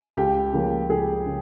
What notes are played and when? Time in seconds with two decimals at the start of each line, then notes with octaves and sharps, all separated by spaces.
0.17 C#2 G4
0.53 C#3 F3 A#3
0.89 C#2 G#4
1.26 C#3